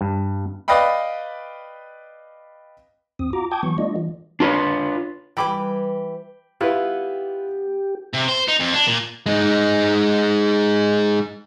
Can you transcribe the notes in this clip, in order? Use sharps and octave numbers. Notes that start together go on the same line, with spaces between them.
G2
B4 D5 D#5 F5 G5 B5
E2 C4 D#6
F4 F#4 A#5 D6
G5 A5 D6 D#6 G6 G#6
E3 F#3 B3 C#6
G3 A3 D4 F4 D5 D#5
E3
D4 F4 B4 C#5
E3 G3 B4 G5 B5 D6
B3 E4 F4 G4 B4
C3
C5
D#4
F2
D4
A#2
G#3 D#4